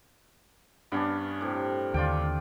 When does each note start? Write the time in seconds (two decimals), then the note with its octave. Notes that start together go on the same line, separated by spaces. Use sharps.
0.92 G2 B3 C#4 D4
1.41 A2 C3
1.94 D#2 D3 F4 D5 G5